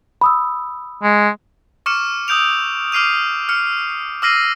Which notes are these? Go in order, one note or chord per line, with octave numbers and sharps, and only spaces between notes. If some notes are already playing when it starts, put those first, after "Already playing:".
B5 D#6 E6
G#3
C#6 D6 F6 C#7 E7
D#6 E6 G6 D7 F7
D6 F6 C7 D#7 F7
F6 C#7
D6 E6 F6 A#6 C7 D#7